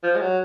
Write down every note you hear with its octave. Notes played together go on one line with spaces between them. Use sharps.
F3
G#3
F#3